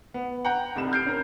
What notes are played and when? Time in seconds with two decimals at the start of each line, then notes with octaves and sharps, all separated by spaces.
0.14 B3
0.45 F#5 G5 A#5 G6
0.75 F1 C2 E7
0.92 F6 G6 C7 D7
1.06 C#4 A#4